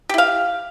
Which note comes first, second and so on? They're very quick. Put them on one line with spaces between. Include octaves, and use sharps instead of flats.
G4 E4 F5